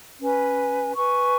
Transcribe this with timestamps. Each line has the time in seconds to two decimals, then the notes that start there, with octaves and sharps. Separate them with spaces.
0.20 C#4 B4 G#5
0.97 B4 G#5 C#6